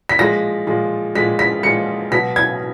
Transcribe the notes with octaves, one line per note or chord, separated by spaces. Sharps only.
B6
A#2 F3 G#3 A#6
A#2 F3 G#3
A#2 F3 G#3 B6
B6
A#2 F3 G#3 C#7
B2 F#3 B6
G#6